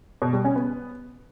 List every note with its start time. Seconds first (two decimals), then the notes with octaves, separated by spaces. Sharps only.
0.22 B2
0.33 G3
0.44 C#4
0.56 B3